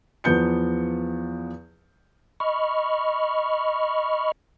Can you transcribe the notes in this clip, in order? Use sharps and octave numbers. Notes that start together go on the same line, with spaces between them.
E2 F3 B3 G6 C#7
D#5 B5 C#6 F6